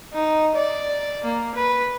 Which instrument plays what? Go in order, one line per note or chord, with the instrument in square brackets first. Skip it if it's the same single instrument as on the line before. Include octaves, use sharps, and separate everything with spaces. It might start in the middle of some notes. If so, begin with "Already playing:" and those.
[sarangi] D#4
D5
A#3
B4